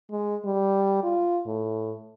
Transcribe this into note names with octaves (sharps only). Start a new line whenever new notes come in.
G#3
G3
F4
A2